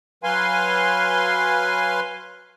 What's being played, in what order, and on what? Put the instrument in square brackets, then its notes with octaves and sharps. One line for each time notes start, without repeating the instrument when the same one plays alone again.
[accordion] F#3 B4 F5 G#5 C6